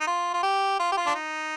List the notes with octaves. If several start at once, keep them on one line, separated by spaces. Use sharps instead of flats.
D#4
F4
F4
G4
F4
G4
F4
D4
D#4